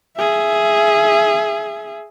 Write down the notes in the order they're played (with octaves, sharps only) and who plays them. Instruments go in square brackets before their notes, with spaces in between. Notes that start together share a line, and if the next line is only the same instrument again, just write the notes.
[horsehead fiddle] G#4 E5